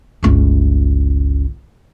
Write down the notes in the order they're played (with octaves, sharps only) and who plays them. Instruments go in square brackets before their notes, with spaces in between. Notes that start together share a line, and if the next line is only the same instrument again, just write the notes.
[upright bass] G1 C#2